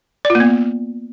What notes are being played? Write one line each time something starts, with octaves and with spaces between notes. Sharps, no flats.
D5
F4
A#3
B3